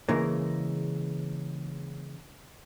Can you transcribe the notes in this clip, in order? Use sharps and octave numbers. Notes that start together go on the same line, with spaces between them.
C#3 E3 G#3 A#3